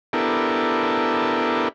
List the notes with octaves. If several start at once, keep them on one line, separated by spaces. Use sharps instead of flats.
B3 D4 E4 G4 A4 A#4